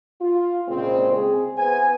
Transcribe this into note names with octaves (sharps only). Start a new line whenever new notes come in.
F4
C2 A#2 C#3 G#3 C4
G#4
B3 E4 B4 C5 G#5